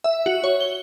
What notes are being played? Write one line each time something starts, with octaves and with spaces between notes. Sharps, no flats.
E5
F#4
C#5
G7